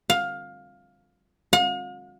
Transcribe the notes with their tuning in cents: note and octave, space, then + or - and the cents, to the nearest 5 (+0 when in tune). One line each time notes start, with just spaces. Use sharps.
F5 +15
F5 +45